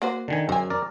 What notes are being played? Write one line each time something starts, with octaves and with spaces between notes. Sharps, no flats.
A#3 F#4 C5
D3 D#3 G#5
F#2 C5 G#5
A#4 D5